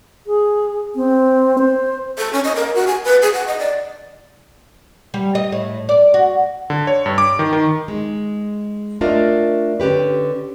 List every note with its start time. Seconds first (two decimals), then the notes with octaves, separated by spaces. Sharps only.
0.27 G#4
0.96 C4
1.59 C5
2.18 A4
2.33 C#4
2.44 D#5
2.55 A#4
2.75 F#4
2.87 G#5
3.04 B4
3.22 G#4
3.33 F#5
3.47 D#5
3.59 D5
5.14 G3
5.35 D#5
5.52 A2
5.89 D5
6.14 F#4
6.70 D3
6.87 C#5
7.06 G2
7.18 D6
7.39 D#3
7.53 D#3
7.88 G#3 D#4
9.01 A3 D4 F4 A#4 D5 D#5
9.80 D3 C#4 G4 B4